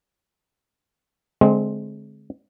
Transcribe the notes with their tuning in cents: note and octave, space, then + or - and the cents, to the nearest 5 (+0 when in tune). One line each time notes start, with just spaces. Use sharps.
D3 +0 G#3 +25 C4 +0